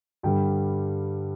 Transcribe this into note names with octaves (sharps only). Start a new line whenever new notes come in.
G2 D3 G3 G5